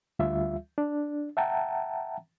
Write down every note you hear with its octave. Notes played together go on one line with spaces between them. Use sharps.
D2 G3 F4 E5
D4
E5 F#5 G5 A5 A#5